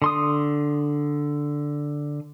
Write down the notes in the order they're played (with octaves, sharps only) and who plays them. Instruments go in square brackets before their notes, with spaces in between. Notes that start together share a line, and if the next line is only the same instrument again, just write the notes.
[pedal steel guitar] D3 C6 D#6